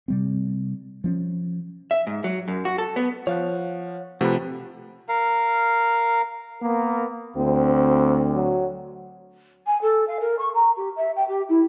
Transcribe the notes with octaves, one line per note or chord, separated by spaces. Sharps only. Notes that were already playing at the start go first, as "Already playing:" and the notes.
C3 G3 C4
F3 C4 C#4
E5
G#2
F#3
F#2
F#4
A4
B3
F3 C#5 F5 F#5
C3 F3 A3 F#4 B4
A#4 F5
A#3 B3 A#4
D2 C4
F#3
G#5
A4
F5
A#4
C#6
A#5
G4
E5
G5
G4
E4